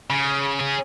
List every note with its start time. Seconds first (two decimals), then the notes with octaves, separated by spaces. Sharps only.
0.10 C#3
0.59 C#4 G#4